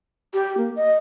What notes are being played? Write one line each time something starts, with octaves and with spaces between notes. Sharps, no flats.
G4
A#3
D#5